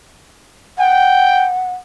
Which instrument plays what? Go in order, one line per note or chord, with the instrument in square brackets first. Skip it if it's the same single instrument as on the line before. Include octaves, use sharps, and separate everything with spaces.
[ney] F#5 [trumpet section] G5